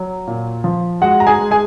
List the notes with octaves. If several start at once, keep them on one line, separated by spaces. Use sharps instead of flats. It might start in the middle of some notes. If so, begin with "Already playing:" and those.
Already playing: F#3
A#2
F3
G#3 F#4 F#5
A#5
G#4 G#5
G#3
G#4 G#5